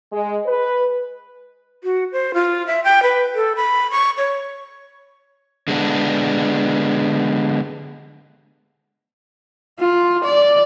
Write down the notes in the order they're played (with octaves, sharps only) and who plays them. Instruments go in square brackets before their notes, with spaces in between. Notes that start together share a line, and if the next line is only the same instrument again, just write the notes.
[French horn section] G#3
B4
[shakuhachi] F#4
C5
F4
E5
G5
B4
A4
B5
C#6
C#5
[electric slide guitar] D3 G#3 B3 D4
[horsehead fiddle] F4
D5